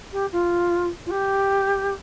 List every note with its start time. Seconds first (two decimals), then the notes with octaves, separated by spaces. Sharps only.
0.13 G4
0.32 F4
1.06 F4
1.11 G4